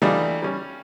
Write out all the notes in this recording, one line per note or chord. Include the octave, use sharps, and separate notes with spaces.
E3 G3 A3 D4 D#4 F4
G3 C#4